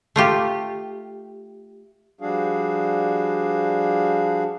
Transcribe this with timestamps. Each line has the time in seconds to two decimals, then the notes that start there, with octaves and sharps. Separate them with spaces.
0.16 A3 F4 G4
2.21 F3 G3 D4 F#4 G#4 F5